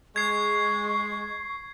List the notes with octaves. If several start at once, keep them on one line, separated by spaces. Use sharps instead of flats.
G#3 C#6 G#6 C7